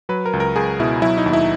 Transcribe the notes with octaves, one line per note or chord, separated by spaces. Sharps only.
F#3 B4
A#4
C#2
A#4
C#2 G#4
B2 E4
F#3 E4
D#4
D#2
E4